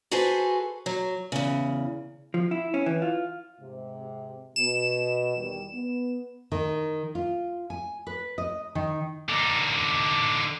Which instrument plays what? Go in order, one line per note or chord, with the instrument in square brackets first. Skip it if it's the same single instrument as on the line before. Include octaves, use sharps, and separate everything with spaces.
[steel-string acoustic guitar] F#4 G#4 A4 B4 C5 G#5
F#3
E2 C#3
[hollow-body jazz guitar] F3
E4
C#4
E3
F4
[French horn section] G#2 C3
[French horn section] B2 [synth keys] E7
[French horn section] E2 D#3 G3
B3
[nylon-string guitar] D#3
F4
G#5
B4
D#5
D#3
[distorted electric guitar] D3 D#4